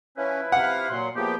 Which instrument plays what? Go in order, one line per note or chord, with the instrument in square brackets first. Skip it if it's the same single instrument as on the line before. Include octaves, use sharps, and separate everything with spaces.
[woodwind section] F3 E4 B4 [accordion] C#4
[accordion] C3 F5 [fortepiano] F#5
[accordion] A#2 F#3 [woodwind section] C6
[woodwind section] E2 G4 [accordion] F3 A#3 B3